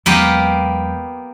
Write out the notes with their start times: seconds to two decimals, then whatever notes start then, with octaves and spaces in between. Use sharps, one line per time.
0.06 E2 F#3 G#3 A#3 B3 G4